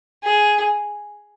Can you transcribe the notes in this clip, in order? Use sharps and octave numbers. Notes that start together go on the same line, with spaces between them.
G#4